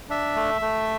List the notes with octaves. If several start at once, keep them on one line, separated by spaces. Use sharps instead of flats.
D4 E5
A3
A3